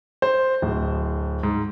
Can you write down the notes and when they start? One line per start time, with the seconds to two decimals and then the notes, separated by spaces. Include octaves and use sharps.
0.22 C5
0.62 D1
1.43 G#2